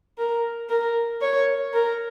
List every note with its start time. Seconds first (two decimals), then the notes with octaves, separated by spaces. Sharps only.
0.18 A#4
0.69 A#4
1.21 C#5
1.74 A#4